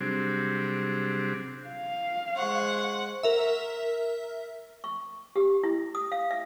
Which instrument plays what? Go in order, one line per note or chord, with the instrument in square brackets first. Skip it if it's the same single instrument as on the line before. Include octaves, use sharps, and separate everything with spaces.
[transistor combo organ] C3 F#3 G3 C4 D4 G#4
[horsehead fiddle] F5
[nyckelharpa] G#3 C#6 [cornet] C5 [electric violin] F#5
[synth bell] A#4 E5
[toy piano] C#6
G4
E4
D#6
F5
E5